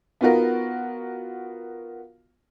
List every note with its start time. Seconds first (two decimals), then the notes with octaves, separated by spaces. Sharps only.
0.21 B3 D#4 F4 F#4 A#4